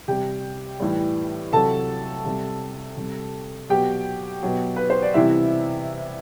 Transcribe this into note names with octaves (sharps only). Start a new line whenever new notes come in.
C3 G3 G4 G5
A2 E3 G3
C3 F#3 A4 A5
C3 G3
C3 G3
B2 F#3 G4 G5
B2 F#3
B4
C5
D5
C3 E3 G3 E4 E5